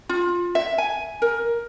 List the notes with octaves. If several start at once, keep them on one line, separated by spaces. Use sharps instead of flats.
F4
E5
G#5
A#4